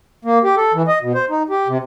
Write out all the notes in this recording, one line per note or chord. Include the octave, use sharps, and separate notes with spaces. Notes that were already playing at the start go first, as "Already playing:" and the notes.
A#3
G4
A4
E3
D#5
B2
C5
D#4
G4
C3